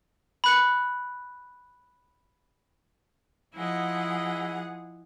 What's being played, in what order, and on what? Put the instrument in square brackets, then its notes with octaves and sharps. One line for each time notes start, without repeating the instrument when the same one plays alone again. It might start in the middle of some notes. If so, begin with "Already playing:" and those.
[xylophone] B5 F#6 C#7
[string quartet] F3 G#4 F#5 [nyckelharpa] E4 D#5